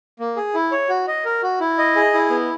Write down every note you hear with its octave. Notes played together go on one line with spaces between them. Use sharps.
A#3
G#4
E4
C#5
F#4
D#5
A#4
F#4
E4
D#5
G#4
E4
B3